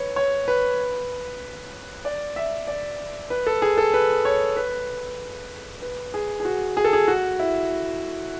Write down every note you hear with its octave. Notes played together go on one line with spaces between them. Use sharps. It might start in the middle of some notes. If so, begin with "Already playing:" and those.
Already playing: B4 C#5
C#5
B4
D5
E5
D5
B4
A4
G#4
A4
B4
C#5
B4
B4
G#4
G#4
F#4
G#4
A4
G#4
F#4
E4